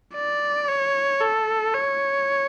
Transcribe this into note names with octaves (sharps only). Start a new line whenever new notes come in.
D5
C#5
A4
C#5